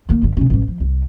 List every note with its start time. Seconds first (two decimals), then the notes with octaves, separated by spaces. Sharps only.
0.09 D#3 A#3
0.22 G1 D3
0.37 C3 C#4
0.50 A1 G3
0.68 F3
0.80 C2